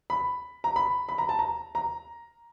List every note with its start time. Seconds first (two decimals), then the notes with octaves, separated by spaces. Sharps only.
0.10 B5
0.64 A#5
0.76 B5
1.09 B5
1.18 A#5
1.29 A5
1.39 A#5
1.75 A#5